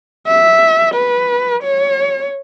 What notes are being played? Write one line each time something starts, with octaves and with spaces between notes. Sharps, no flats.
E5
B4
C#5